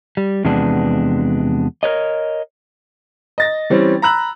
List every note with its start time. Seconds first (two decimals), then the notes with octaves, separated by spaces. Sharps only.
0.17 G3
0.45 E2 C3 F3 G#3 B3 D4
1.83 A#4 B4 C#5 D#5
3.38 D#5 A6 A#6
3.70 E3 G3 C4 C#4
4.02 A#5 B5 E6 F#6 F#7